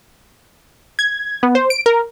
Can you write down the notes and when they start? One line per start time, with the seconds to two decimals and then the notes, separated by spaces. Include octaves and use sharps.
0.99 G#6
1.43 B3
1.55 C5
1.70 D7
1.86 A#4